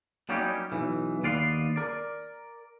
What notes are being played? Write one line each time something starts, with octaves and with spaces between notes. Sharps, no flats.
F#3 G3 A#3 C#4 D#4 G4
B1 E3
D#2 B3 D5 F5 C6
A#4 D5